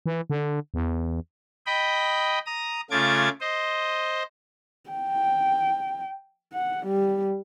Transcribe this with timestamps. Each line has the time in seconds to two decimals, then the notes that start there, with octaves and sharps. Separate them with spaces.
0.06 E3
0.30 D3
0.74 E2
1.66 D#5 G5 B5
2.46 A#5 D#6
2.91 C#3 A3 F4 D6 G#6 A6
3.40 C5 D#5
4.90 G5
6.53 F#5
6.86 G3